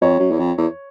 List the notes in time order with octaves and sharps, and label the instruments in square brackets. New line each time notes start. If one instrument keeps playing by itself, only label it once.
[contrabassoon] F2 [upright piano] C#5
[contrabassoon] F#2
E2
F2
E2